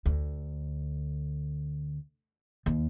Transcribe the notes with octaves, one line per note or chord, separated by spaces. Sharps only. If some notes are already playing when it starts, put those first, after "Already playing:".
D2
D#2